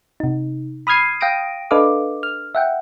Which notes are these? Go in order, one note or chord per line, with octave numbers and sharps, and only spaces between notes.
C3 D#4
B5 D#6 F6 G#6 C7 D#7
F5 G5 D#6 A#6 D7 D#7
D4 A4 B4 D#5 F5 D6
F6
E5 F#5 G5